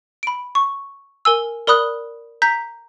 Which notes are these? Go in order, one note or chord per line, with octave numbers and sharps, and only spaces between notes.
B5 D7
C#6
A#4 G#5 E6
A#4 D5 B5 D#6 F#6
A#5 G6 B6 F7